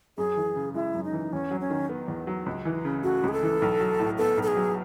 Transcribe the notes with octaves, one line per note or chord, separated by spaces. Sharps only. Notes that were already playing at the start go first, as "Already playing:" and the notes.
F#2 G#4
E3
C#3
G#3 E4
F#2
D#4
E3
E2 C#4
F#3
C#4
D#3
B3
E2
F#3
C#2
E3
C#3
A3 F#4
C#2 G#4
A4
E3
B1
F#3
A2
B3 A4
B1
A4
G#4
F#3